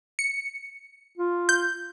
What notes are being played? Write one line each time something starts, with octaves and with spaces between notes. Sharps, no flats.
C#7
F4
G6